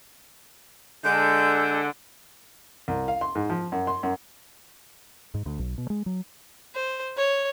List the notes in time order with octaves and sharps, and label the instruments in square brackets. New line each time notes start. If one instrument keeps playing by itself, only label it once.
[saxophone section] D3 [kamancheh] G#3 E6 [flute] G6
[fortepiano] C2
F5
C6
G#2
F3
F#2
C6
F#2
[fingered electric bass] G#2
D2
B1
B2
G#3
F#3
[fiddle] C5
C#5